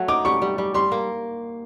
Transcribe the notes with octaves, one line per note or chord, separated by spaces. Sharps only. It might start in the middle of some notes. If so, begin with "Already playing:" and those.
Already playing: F#3 A3
D#4 D6
G3 C#6
G3
G3
G3 C6
A#3